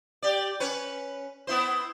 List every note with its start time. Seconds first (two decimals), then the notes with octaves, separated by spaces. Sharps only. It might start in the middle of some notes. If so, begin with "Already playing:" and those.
0.22 G4 D5
0.60 C#4 B4 C#5
1.47 B3 E4 C5